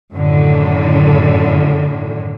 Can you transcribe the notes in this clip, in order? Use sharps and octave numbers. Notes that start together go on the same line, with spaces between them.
F#2 A2 D3 D#3